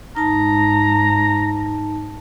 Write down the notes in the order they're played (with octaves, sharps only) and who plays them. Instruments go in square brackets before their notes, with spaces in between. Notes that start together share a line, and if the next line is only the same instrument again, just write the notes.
[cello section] G#2 [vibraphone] D#4 A5 [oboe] A#5